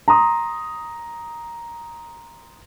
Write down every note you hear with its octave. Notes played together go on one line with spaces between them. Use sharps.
A#5 C6 D#6